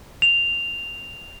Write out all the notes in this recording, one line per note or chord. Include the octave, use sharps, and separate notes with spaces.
F7